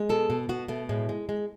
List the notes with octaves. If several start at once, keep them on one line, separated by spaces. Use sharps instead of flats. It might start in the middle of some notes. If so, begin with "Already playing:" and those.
Already playing: G#3
B2 A4
B2
B2 F#4
B2 A3
A2 G#3
G#3
G#3